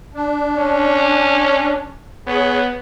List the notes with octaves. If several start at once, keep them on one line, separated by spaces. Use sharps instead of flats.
D4
C#4
B3 G#4 C#5